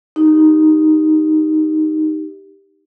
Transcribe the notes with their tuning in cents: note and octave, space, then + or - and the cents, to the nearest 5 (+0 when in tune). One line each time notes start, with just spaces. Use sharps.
D#4 +0 G4 +0